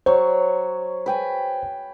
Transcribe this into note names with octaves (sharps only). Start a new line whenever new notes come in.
F#3 C5 C#5
B4 G5 G#5